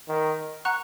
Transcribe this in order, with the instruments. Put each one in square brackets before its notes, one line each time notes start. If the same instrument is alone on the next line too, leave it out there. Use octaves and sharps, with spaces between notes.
[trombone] D#3
[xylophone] F#5 A#5 C#6 F#6